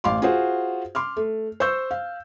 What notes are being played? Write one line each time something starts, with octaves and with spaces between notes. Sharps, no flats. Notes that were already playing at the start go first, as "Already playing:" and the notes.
A1 F5 C6 D6
F4 F#4 G#4 C5
C6 D6 F6
A3
C5 C#6 E6 G6
F5